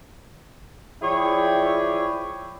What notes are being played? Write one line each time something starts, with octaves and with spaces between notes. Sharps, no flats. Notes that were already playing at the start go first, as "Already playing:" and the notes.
F3 E4 G#4 C#5 D5 G5